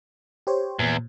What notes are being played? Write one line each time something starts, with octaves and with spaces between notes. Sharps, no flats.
G4 C5 C#5
E2 A#2